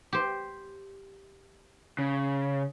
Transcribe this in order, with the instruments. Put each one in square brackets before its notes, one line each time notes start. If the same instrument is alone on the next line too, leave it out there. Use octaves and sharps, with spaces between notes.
[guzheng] G4 C5
[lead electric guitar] C#3